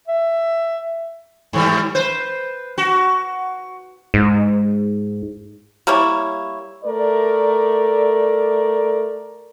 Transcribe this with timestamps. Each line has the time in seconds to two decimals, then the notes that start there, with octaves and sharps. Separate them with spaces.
0.08 E5
1.53 G#2 E3 G3
1.95 B4 C5
2.78 F#4
4.14 G#2
5.87 G3 A#3 E4 C#5
6.84 A3 A#4 D5